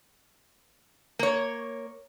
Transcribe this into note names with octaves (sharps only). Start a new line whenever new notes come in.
A#3 C#5